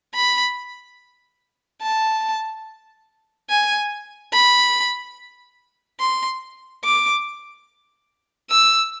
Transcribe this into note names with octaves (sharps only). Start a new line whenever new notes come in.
B5
A5
G#5
B5
C6
D6
E6